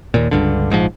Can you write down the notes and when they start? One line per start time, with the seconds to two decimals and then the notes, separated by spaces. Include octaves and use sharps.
0.14 D#2 A#2
0.31 C#2 G2 D3
0.70 A#1 G#2 C#3 F3